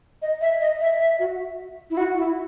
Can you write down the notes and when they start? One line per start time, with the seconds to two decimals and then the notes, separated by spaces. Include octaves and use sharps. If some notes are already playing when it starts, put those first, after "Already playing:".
0.22 D#5
0.41 E5
0.61 D#5
0.81 E5
1.00 E5
1.19 F#4
1.90 E4
1.97 F#4
2.17 E4